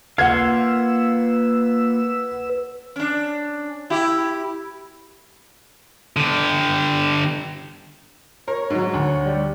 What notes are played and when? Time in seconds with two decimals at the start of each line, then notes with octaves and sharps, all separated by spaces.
0.18 A#3 F4 B4 F5 F#5 E6 G#6
2.96 C#4 D4
3.90 E4 G4
6.16 D3 G4
8.48 A#4 C#5
8.70 G#2 F#3
8.93 D2 D3
9.25 G3